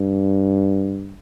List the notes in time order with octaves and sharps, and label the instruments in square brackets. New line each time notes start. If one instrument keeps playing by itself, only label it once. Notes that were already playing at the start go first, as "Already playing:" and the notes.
Already playing: [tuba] G2